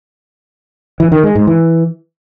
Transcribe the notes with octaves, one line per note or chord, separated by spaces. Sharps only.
E3
D#3
G#3
G#2
E3